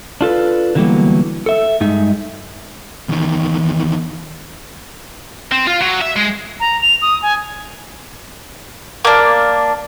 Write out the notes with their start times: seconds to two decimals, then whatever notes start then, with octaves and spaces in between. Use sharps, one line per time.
0.21 D4 F4 A4 B4
0.75 D3 E3 F#3 G3 A#3 B3
1.46 A4 E5
1.81 G2 G#3 D#4 E5
3.09 E2 D#3
5.52 C4
5.67 F4
5.81 F#3
6.01 E5
6.16 G#3
6.60 A#5
6.81 F7
7.02 D#6
7.22 G#5
9.05 A#3 D4